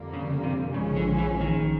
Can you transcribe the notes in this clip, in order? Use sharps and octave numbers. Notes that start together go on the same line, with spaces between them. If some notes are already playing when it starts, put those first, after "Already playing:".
Already playing: F2 D3 G3 A#3
C#3
C3
A#1 G#2 C#3 F3 G#3 C#4
D3
E3
D#3